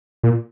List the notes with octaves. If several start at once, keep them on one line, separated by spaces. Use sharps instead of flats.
A#2